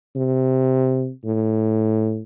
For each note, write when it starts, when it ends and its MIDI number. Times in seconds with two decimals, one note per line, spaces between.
0.16 1.11 48
1.24 2.23 45